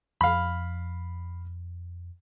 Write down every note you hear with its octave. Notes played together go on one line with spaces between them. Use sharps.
F2 F5 B5